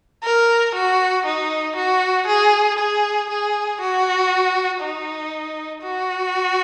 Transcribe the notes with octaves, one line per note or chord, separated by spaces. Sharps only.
A#4
F#4
D#4
F#4
G#4
G#4
G#4
F#4
D#4
F#4